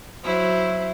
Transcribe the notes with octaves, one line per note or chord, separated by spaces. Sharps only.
F#3 E4 C5